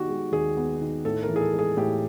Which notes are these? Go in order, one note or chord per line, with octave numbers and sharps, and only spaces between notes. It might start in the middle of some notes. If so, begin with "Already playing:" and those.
Already playing: D#3 B3 F#4 G4
G#3
D#2 G#4
B3
D#3
A2 A4
A#4
E3
G#4
A4
G#3
G#4
A2 G4